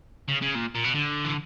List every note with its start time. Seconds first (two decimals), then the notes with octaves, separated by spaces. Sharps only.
0.28 C#3
0.42 C#3
0.55 A#2
0.75 A#2
0.84 B2
0.95 D3
1.25 E3